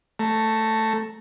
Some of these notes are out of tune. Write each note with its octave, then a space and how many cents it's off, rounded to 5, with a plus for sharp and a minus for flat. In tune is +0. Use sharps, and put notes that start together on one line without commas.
A3 +5 A#5 +0